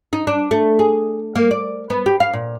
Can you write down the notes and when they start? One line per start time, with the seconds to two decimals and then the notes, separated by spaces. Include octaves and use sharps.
0.13 D#4
0.27 D4
0.51 A3
0.79 G#4
1.35 A#3
1.51 D5
1.90 B3
2.06 G4
2.20 F5
2.33 A#2